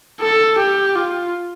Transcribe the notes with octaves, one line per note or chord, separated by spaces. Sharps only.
A4
G4
F4